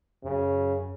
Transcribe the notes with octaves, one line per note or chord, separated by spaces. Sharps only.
F#2 C#3